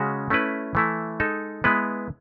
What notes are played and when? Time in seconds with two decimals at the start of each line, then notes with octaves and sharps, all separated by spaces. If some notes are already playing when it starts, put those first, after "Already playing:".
Already playing: C#3 G#3 C#4 F#4
0.30 A3 C#4 E4 B4
0.75 E3 A3 E4
1.20 G#3 D#4 A4
1.64 G#3 B3 E4 B4